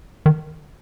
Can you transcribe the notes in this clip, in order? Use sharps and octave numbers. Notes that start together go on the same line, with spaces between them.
D#3